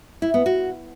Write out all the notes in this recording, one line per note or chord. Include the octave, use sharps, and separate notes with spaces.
E4
B3
F#4